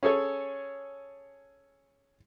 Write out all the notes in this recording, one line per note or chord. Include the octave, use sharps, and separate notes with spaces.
C#4 G#4 A4 C#5